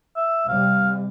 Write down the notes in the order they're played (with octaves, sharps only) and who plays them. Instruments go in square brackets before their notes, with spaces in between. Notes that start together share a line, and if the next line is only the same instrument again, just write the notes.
[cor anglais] E5
[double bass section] C3 G3 [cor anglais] F5